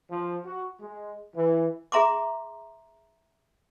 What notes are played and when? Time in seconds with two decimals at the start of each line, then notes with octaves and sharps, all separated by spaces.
0.11 F3
0.44 F#4
0.80 G#3
1.35 E3
1.92 G#4 E5 A#5 C6 D6